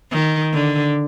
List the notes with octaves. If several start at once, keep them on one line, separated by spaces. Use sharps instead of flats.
D#3
D3